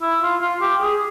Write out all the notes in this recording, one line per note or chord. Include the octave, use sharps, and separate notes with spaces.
E4
F4
F4
G4
G#4